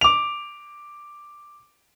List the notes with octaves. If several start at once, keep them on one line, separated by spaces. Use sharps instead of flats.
D6 F7